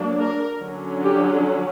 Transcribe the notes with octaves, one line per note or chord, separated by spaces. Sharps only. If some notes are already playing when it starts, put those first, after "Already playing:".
Already playing: F#3 A#3 D4
A#4
D3 F#3 C#4
G4